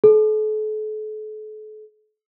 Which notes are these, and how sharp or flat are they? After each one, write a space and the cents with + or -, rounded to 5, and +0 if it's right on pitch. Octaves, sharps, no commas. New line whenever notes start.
A4 -40